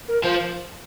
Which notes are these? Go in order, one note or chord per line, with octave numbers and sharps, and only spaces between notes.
A#4
F3 C5